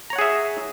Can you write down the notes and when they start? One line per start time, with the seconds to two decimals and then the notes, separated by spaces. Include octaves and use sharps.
0.10 A#5
0.13 C#5
0.16 F#5
0.18 G#4
0.21 E5